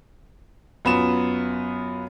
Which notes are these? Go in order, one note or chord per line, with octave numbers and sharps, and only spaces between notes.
F#2 B3 F4 E7